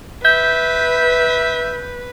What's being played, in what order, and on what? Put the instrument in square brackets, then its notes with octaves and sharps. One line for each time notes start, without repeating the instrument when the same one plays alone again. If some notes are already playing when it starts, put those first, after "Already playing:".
[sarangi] B4 [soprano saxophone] E5 [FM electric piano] G6